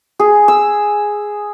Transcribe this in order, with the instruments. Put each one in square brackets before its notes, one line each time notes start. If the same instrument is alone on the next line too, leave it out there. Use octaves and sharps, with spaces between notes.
[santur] G#4
E6